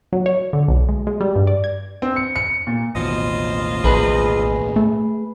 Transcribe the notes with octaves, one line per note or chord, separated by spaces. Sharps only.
F#3
C#5
D3
B1
G#3
G#3
G3
G2
D5
G#6
C4
C#7
C#7
A#2
A1 D#2 B2 F4 C5 D#5
A#1 G#4 B4
A3